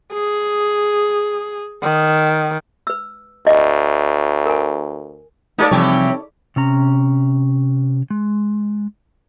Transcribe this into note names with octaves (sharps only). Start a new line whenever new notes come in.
G#4
D#3
B4 E6
D2 D#5
A#4 G#5
A#3 D#4 A4 D5
C3 E3 F3 G3 C4 G4 C#5
C3 C#4 A#5
G#3